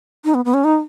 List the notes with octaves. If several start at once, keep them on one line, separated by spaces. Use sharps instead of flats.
D#4
B3
B3
C#4
D#4